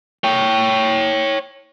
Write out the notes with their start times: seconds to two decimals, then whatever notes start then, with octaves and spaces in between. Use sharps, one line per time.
0.24 C#5 G5